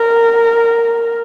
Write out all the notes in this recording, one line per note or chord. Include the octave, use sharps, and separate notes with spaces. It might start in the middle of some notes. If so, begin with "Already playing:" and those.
Already playing: A#4